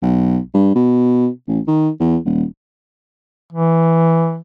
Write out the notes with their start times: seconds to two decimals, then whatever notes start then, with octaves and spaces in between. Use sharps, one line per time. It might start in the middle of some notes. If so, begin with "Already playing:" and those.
0.03 B1
0.54 G2
0.76 B2
1.48 A1
1.68 D#3
2.00 E2
2.25 D#1
3.53 E3